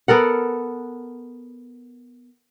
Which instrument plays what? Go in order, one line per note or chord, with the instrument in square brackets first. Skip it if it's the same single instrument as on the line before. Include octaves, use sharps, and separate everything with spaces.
[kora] B3 A4 A#4 F#5